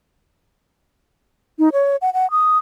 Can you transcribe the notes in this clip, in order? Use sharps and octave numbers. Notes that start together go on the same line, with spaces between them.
D#4
C#5
F#5
F#5
D#6